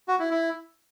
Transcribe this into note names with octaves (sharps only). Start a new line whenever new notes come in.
F#4
E4
E4